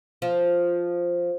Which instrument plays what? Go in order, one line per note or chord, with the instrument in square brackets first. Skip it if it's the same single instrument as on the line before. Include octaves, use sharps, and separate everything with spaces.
[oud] F3